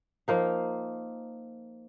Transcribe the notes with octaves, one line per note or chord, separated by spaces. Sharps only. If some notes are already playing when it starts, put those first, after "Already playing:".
F3 A#3 D#4